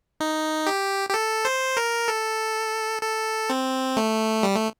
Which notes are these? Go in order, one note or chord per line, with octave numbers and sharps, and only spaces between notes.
D#4
G4
G4
A4
C5
A#4
A4
A4
C4
A3
G3
A3